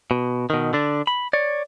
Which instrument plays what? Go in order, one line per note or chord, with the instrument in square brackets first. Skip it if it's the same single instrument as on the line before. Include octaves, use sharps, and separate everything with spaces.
[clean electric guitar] B2
B2 D#3
D3 D4
B5
C#5 D5